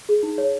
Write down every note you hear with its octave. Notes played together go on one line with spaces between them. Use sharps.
G#4
D#4
C#5